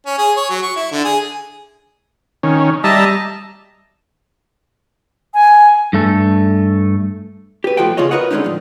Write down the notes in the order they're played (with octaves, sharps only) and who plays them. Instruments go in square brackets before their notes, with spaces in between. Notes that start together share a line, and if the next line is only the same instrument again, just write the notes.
[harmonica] C#4
G#4
C#5
F#3
C#6
E4
D3
G#4
[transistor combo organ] D#3 C#4
[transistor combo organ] G3 E5 A#5 [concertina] D#5 A5
[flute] G#5
[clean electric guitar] G2 A3 A4
[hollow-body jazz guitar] G4 B4
B1 A2 F3 F#4 A4 G5
C#3 F4 G#4 C#5 D#5
F#4 G4 A#4 B4 D#5 F#5
D3 G#3 C4 C#4 D#4
A2 F3